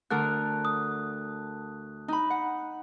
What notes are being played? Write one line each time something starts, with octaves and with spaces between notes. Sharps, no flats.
D2 D3 A#4 F#6
D#6
D#4 B5
F#5